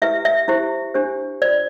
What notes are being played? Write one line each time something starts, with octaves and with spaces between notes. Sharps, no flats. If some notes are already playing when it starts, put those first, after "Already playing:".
E4 G4 B4 E5
E5
E4 G4 C5
D4 G4 C5
F4 C5 D5